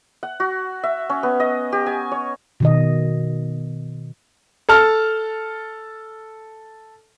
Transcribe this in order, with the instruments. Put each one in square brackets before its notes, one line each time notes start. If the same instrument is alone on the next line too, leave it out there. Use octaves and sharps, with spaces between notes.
[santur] F#5
F#4
E5
C#4
B3
D#5
G4
G#5
C#5
[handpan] B2 D#3 D#5
[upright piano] A4 A5 F6